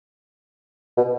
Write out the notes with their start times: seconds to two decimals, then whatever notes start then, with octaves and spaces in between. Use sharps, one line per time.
0.98 B2